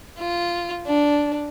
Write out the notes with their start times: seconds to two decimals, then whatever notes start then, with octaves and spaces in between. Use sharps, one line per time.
0.19 F4
0.86 D4